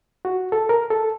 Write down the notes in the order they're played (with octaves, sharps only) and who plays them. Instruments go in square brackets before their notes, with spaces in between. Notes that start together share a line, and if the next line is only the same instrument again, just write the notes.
[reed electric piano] F#4
A4
A#4
A4